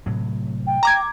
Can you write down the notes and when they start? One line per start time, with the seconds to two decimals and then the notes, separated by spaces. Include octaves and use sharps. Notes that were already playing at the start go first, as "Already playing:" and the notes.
0.06 A2 C3 F#3
0.67 G5
0.83 A#5 D6 G#6